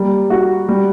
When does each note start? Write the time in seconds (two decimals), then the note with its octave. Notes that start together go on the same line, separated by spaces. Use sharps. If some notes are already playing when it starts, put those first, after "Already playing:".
Already playing: G3 A#3
0.30 F#4
0.68 G3